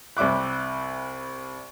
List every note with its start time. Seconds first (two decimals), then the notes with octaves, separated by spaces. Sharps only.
0.17 C2 G3 E5 D6 F#6